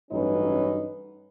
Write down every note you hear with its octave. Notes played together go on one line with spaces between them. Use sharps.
A1 G2 F#3 C#4 D#4 B4